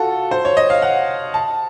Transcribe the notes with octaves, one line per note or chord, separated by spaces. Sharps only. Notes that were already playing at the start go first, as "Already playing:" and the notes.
Already playing: F4 F#4 A4
C5
C#5
D#5
F5
F#5
A5